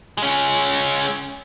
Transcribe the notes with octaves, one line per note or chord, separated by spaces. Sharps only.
G#3 C#4